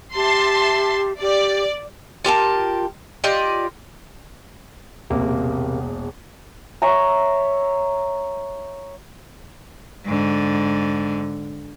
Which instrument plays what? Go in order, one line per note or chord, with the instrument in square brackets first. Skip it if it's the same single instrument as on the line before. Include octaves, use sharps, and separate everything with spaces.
[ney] G4 [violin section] E5 A5 C6
[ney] G4 [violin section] D5
[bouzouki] F4 G4 A#4 A5
F4 G4 D5 D#5
[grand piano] E1 A#1 [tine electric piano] C3 A#3
[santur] C#5 E5 A#5
[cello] G#2 D3